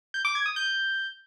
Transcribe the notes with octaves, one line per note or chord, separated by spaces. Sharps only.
G6
D6
G#6
D#6
G6